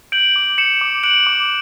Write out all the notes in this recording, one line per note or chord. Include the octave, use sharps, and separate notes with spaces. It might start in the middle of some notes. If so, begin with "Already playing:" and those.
G6 D7 F#7
D6
G6 C#7 E7
D6
F#6 D7 F#7
D6